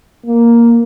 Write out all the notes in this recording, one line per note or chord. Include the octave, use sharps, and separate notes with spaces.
A#3